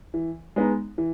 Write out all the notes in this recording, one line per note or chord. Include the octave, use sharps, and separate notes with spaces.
E3
G#3 B3 D#4
E3